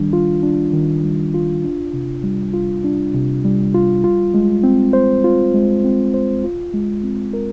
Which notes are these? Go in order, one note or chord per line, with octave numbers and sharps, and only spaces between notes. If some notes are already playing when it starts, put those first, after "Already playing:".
Already playing: D#3 G3 D4
F4
D4
D#3
G3
F4
D4
C3
G3
F4
D4
C3
G3
F4
F4
G#3
C4
C5
F4
G#3
C4
C5
F4
G#3
C4
A#4